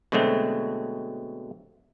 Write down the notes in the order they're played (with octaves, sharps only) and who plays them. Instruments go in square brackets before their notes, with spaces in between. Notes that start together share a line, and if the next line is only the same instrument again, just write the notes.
[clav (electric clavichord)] B2 D3 F#3 G#3 A3 C4